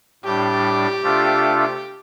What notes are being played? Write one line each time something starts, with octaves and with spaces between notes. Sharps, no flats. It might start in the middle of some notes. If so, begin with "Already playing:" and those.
A2 G3 D4 G4
C3 A3 D4 F4 A4